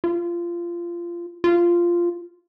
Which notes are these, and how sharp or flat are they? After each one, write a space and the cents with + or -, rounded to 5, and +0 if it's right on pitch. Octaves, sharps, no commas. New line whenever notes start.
F4 -20
F4 -10